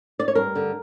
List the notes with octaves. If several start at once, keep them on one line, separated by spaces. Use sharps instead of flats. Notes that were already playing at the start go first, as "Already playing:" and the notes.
D5
C#5
G2 A#4
D3